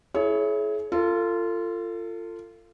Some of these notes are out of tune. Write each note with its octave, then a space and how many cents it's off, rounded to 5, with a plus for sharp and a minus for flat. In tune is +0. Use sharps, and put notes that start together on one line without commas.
E4 +0 G#4 +40 C#5 +0
F4 -15 A4 +30